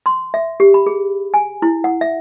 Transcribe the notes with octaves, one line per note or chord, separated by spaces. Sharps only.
C6
E5
G4
B5
G#4
G#5
E4
F#5
E5